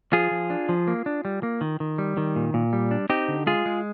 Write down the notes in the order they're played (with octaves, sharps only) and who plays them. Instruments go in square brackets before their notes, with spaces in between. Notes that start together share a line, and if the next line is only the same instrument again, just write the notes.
[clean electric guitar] F3 F4 G#4
F3
D4
F3
A#3
D4
G3
A#3
D#3
D#3
G3
D#3
A#2
A#2
G3
D4
C4 D#4 G4
D3
G#3 F4 G#4
G#3